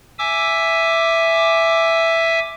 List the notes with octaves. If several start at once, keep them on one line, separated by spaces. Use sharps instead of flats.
E5 G#5 D6 E6